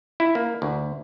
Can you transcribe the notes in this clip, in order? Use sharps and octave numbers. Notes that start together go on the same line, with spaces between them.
E4
A#3
D2